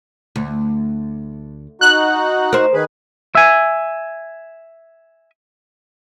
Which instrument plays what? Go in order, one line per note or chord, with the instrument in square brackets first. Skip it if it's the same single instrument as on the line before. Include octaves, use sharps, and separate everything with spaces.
[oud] D2
[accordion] D#4 F#4 [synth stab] F#6
[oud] A#4 C5
[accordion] D#3 G#4 B4
[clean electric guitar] E5 G#5